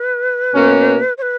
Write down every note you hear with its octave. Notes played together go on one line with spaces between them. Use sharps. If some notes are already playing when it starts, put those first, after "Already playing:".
Already playing: B4
B2 A#3 C#4
C#5
B4